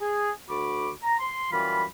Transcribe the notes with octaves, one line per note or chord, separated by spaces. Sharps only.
G#4
D2 F#4 B5 D6
A#5
C6
F#2 E3 G3 F4 B5